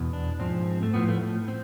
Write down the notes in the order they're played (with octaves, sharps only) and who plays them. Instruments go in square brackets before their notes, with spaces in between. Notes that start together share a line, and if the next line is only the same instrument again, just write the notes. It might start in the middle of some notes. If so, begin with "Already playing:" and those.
Already playing: [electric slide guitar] E2 B2
D4
G#2 F3 C4
A3
A2 F3 B3
A3
A3
C4